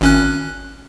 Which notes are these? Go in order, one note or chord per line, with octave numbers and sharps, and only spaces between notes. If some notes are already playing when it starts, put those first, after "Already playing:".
G#1 C#4 F#6